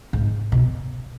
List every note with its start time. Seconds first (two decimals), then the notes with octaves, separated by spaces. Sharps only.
0.13 G#2
0.52 B2